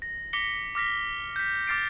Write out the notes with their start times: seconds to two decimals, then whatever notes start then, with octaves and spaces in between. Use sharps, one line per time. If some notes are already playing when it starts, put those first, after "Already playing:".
0.02 A#6
0.33 D6 A#6 B6 C#7 G7
0.75 D6 F6 A#6 B6
1.36 G6 B6
1.67 D6 F6 A6 C7 D7